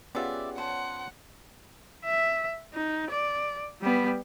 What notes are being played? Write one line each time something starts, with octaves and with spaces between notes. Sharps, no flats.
B3 C#4 F4 G4 G#4 D5 E5 F#5
C5 C#5 F#5 A5
E5
D#4
D5
G3 B3